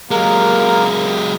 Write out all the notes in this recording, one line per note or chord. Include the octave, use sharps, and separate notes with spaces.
F#3 G#3 A#3 A#4